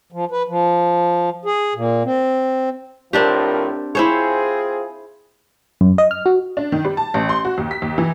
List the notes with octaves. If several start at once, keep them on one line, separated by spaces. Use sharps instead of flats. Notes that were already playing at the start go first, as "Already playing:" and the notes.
F3
B4
F3
G#4
A#2
C4
A2 F3 C4 D4 G4 A#4
C4 E4 F4 G#4 C5 C#5
F#2
D#5
F6
F#4
D4
D#3
G3
A5
A1
C6
F#4
D#2
B6
D#2
E3